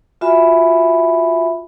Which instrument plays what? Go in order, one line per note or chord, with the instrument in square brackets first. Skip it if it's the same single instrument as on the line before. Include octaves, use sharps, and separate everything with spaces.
[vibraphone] F4 F#4 E5 G#5 B5